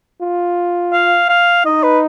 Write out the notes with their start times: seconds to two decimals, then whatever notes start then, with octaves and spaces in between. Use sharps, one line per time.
0.21 F4
0.93 F5
1.29 F5
1.65 D#4 D#5
1.83 B4